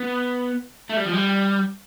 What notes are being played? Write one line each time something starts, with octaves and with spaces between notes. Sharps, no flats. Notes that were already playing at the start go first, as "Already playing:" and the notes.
Already playing: B3
A3
G3
F3
G3